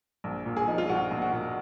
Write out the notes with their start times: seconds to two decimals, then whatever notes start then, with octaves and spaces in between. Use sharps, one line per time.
0.24 A#1
0.46 A#2
0.57 G#4
0.68 F3 D#4
0.78 F4
0.89 A#1 F#4
1.11 A#1
1.22 F#4
1.32 A#2